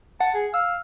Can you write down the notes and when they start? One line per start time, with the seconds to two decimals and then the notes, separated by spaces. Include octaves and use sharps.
0.20 F#5 A5
0.34 G#4
0.54 F5 E6